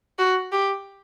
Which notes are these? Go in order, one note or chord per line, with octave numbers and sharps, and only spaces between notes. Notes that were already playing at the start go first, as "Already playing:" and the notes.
F#4
G4